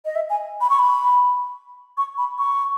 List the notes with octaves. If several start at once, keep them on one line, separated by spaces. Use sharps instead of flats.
D#5
E5
G#5
B5
C#6
B5
C#6
B5
C#6